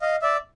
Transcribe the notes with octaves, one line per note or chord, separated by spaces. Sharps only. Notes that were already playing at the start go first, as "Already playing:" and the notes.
D#5 F5
D5 E5